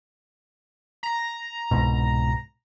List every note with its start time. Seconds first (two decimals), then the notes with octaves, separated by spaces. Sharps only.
1.03 A#5
1.71 C2 G#2 B2